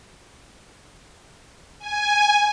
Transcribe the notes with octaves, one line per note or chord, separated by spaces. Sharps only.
G#5